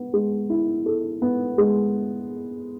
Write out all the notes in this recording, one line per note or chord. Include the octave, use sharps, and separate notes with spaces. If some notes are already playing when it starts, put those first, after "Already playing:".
Already playing: B3
G#3
E4
A4
B3
G#3